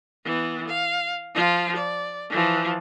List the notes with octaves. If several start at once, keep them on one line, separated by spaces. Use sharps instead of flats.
E3 B3
F5
F3 F4
D5
E3 F3